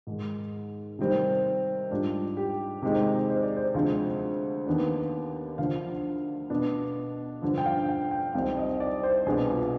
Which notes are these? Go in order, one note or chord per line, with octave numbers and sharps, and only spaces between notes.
G#2 D#3 G#3
C3 D#3 G3 C4
G#2 G3 D4 F4
G4
C3 D#3 G#3 C4 D#4 G4
C5
D5
C5
D2 C3 F3 G#3 C4 F5
D#2 D#3 B3 D4
D2 D3 F3 F5
B2 B3 D4
G2 D3 F3
G5
F5
G5
G5
C2 C3 G3 C4 D#4 F5
D#5
D5
C5
C2 B2 B3 D4 G#4
F4